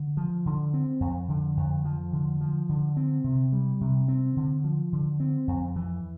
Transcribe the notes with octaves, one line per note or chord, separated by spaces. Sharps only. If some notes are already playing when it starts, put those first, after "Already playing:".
Already playing: D3
F3
D3
C4
F2
D3
F2
F3
D3
F3
D3
C4
C3
G3
C3
C4
D3
F3
D3
C4
F2
E3